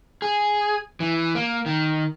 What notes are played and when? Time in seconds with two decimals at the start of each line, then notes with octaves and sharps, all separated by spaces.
0.22 G#4
1.00 E3
1.35 A#3
1.66 D#3